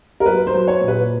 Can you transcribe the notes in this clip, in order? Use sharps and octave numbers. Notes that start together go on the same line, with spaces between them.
A#4
F#3 B4
C5
F#3
C#5
A#2
B4